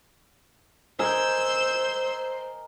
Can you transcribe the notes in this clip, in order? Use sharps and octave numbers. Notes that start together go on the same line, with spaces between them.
A#4 C5 D#5 G#5 E6 G6